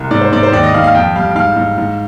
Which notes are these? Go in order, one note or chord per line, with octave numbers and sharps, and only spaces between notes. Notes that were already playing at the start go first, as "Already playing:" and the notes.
Already playing: C2
G#2 D5
C5
G#2 D5
C5
D#2 D5
D#5
D#2 F5
F5
F2 G5
G3 F5
G#2 F5
G#2
G#2